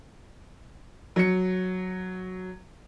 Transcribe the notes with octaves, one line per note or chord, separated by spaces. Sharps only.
F#3 C#7